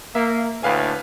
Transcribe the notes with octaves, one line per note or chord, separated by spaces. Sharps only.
A#3 E5
D2 A2 B4 F5 G#5